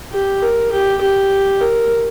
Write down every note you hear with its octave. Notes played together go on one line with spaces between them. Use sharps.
G4
A#4
G4
G4
A#4